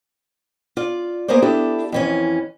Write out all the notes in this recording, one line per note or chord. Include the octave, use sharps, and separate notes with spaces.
F4 D5
A#3 B3 G#4 A#4 C5 D5
B3 D4 E4 G4 A4
F2 E3 C#4